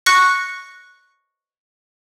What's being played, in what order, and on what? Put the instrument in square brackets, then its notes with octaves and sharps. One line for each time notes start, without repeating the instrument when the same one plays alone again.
[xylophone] C#6 F#6 A#6 C#7